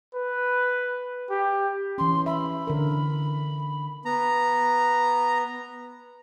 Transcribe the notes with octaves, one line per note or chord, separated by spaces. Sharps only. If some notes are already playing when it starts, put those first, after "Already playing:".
B4
G4
E3 C#4 C6
E5 B5
D3 A#4
B3 A#5